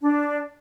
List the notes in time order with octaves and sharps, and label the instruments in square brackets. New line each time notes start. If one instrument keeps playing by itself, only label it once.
[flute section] D4